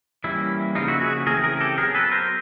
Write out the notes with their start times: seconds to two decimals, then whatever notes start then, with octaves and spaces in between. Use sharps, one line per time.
0.24 E3 G3 A#3 C#4 E4
0.75 C#3 F3 A#3 D#4 F4
0.88 E4 F#4
1.01 F#4 G#4
1.26 C#3 E3 A3 C4 G#4 A#4
1.44 G#4 A#4
1.60 G4 A4
1.78 F#3 B3 G#4 A#4
1.95 A4 B4
2.11 A#4 C5